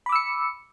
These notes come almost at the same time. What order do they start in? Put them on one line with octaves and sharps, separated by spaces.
B5 D6 E6 C#7